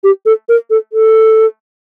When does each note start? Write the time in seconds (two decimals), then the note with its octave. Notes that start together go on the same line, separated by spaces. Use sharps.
0.04 G4
0.26 A4
0.49 A#4
0.70 A4
0.93 A4